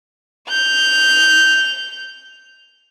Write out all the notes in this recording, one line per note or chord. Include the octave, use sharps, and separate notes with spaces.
G6 F7